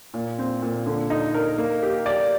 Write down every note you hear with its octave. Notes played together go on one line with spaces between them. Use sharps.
A#2
C4
A#2
D3
D#4
A#4
A#3
G4
D5